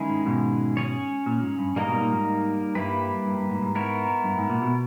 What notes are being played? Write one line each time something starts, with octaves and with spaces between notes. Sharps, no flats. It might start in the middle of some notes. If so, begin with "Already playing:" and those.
Already playing: D#3 G#3 C#4 E4 G#4
G#2
G#2 B2
C#4 G#4 C#5
A#2
G#2
G2
G#2 G3 A#3 D#4 A#4 D#5
G#2 B2
A#2
G#2
G2 G3 A#3 E4 G4 B4
G2
G2
G#2
G#2
B3 E4 A#4 C#5
G2
G#2
A#2
B2